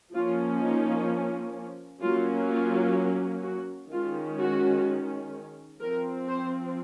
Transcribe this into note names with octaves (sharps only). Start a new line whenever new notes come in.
F3 A#3 C#4 F4
D#4
F#3 A#3 C#4 F4
F4
F#4
D#3 G#3 C#4 F4
F#4
F3 C4 A#4
C5